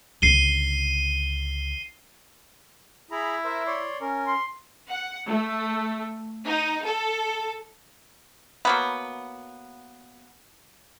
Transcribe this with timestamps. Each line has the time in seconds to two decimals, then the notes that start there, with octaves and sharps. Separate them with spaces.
0.22 C#2 D3 C7 D#7 G7
3.11 E4 G#4 A#5 B5
3.44 A#4 C5 E5
3.66 C#5 D5 C6
4.01 C#4 A#4
4.27 C6
4.90 F#5
5.28 A3
6.46 D#4
6.85 A4
8.65 F#3 A#3 B3